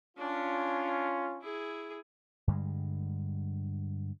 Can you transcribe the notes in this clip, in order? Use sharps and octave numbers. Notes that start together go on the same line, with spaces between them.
C#4 D4 F4
E4 G#4
G2 D3 G3 G#3